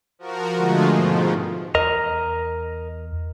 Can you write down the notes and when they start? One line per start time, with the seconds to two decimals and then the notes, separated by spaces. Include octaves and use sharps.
0.19 F3 F#4 A#4
0.56 D3 F3 G#3 A3 F4 F#4
0.90 G#2 B2 D#3 F3
1.75 E2 A#4 D#5 A#5